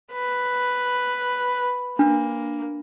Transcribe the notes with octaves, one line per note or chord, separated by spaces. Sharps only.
B4
A#3 D4